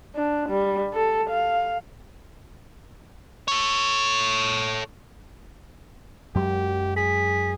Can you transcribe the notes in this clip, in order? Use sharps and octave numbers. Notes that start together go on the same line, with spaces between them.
D4
G3
A4
F5
A4 C#5
F#2 F#3 G#3 G4
G#4 B6